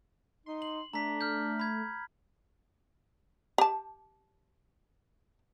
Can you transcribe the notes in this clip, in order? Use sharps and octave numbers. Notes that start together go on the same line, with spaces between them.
D#4 C6
F#7
A3 D4 A#5 B6
F6 G6
B5 G#6
G4 A5